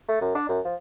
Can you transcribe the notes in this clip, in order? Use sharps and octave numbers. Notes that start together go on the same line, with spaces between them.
A3
F#2
D4
F#2
F3